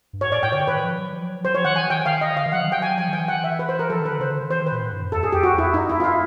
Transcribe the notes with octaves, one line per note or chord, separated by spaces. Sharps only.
G2
G#2 C#5
A2 D5
A2 G5
D3 C#5
D#3 B4
F3
F#3
F3
F#3
F3
F#3 C5
F3 C#5
D#3 F#5
E3 G#5
D#3 G5
D#3 F5
D#5
D3 F5
D#3
F#3 F#5
F3
F#3 G5
G#5
F3 G#5
D#3
G5
E3
F#5
E5
B4
C5
A#4
F3 A4
D#3
B4
D3
C#3 C5
D3
D#3
E3 C5
D#3
B4
A#2
A2
G2
F#2
E2 A4
F#2 G#4
F2 G4
F#4
E2
E4
F2
F#2 D#4
E4
F4
E4